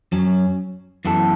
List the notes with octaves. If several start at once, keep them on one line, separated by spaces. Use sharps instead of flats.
F#2 F#3 C#4
F#2 E3 B3 A4